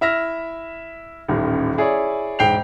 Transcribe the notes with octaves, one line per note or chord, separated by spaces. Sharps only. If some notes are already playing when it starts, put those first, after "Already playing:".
E4 E5 F6 A#6
D#1 A1 D#3
E4 G#4 C#5 D5
E1 G#2 G5 G6 C7 F7